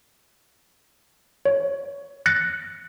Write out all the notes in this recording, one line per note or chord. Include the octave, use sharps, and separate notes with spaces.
C#5
F#6 A6 A#6 C#7